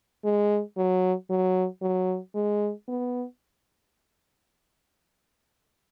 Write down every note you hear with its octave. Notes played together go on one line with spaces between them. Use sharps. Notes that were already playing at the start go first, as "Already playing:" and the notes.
G#3
F#3
F#3
F#3
G#3
B3